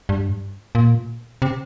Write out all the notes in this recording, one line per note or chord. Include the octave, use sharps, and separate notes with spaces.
G2
A#2
C3